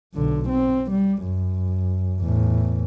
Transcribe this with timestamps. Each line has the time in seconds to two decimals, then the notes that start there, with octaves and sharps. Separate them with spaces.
0.14 B1 D3
0.49 C4
0.91 G3
1.24 F#2
2.20 E2 A2